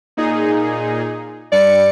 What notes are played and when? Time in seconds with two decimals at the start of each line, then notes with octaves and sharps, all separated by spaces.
0.17 A#2 D#4 G#4
1.52 G2 D5 C#7